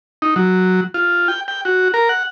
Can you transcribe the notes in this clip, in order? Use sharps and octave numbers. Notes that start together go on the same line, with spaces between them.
D#4
F#3
F4
G5
G5
F#4
A#4
F#5